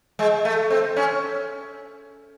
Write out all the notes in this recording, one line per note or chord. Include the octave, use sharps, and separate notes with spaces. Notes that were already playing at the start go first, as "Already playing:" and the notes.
G#3
A3
C4
C#4